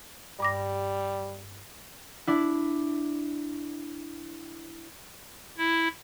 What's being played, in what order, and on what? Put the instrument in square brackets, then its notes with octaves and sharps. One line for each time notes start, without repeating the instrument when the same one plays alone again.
[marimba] G2 D6 A#6 [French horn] G3
[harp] D4 E4
[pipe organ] E4